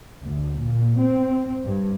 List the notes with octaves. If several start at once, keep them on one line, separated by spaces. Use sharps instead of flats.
D2
A#2
C4
G2